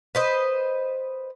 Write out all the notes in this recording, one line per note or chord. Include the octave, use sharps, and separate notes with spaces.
B4 C5 D#5